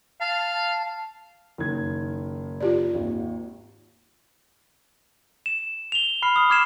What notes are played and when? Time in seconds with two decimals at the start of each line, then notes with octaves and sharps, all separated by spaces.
0.20 F5 A5
1.58 F#1 D#3 G#6
2.61 F4 G4 D5
2.94 G#1 D#2
5.46 E7
5.92 F7 G7
6.22 B5 F6 C7
6.36 D#6 F6
6.50 D6 F6 G#6 C7 E7